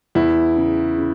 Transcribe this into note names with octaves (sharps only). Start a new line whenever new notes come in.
E2 E4
C#3
C#3